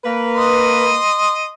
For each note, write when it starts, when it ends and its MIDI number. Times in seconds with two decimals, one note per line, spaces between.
0.05 0.99 58
0.05 0.99 71
0.36 1.54 75
0.36 1.54 84